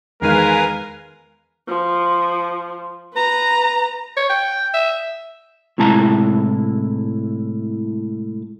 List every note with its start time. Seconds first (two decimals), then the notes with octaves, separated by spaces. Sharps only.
0.22 E2 D#3 G#3 A#4 B4 F5 G#5
1.68 F3
3.14 B4 A#5
4.17 C#5
4.29 G5
4.74 E5
5.78 A2 C3 G#3 E4 A5 A#5